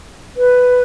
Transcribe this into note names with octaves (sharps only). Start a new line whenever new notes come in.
B4